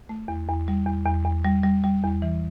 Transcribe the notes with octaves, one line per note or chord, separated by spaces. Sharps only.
A3
E2
E2
G3
E2
E2
E2
G3
G3
G3
E2
E3